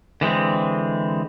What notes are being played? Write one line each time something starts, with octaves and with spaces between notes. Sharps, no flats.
D3 E3 G#3 C4